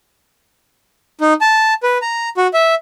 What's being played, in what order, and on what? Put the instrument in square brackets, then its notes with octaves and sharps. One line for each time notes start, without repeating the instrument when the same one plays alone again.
[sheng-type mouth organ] D#4
A5
B4
A#5
F#4
E5